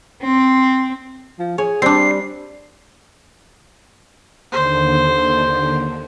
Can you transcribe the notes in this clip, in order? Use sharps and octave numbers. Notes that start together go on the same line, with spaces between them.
C4
F3
G#4 C#5
G3 C4 D4 C7
D#2 D3 C5